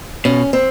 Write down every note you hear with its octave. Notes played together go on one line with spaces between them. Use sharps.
B2 C#4
C4